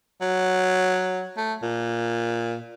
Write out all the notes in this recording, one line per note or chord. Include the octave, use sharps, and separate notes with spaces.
F#3
A3
A#2